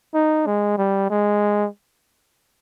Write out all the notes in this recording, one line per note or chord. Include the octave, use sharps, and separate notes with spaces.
D#4
G#3
G3
G#3